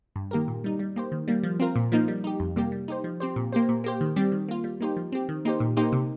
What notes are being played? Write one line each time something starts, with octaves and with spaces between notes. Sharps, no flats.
G2
D#3 A#3 G4 A#4
A#2
G3 D#4
G3
A#3 G4 C5
D#3
G3 A#3
F3
C4 F4 A#4
A#2
F3 A#3 D#4
G3
D#4 G4
F2
C3 G3 A#3 G4
G3
D#4 G4 C5
F3
C4 G4 C5
A#2
A#3 G4 C5
A#2
A#3 G4 C5
D#3
G3 C4 G4
D#3
A#3 F4
G3
A#3 D#4 G4 C5
F3
C4 G4
D#3
A#3 D#4 G4 C5
A#2
A#3 D#4 G4 C5
C3